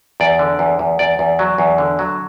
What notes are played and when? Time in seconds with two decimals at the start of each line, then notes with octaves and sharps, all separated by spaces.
0.20 E2 D5
0.39 D3
0.59 E2
0.79 E2
0.99 E2 D5
1.19 E2
1.39 F#3
1.58 E2
1.78 D3
1.99 F#3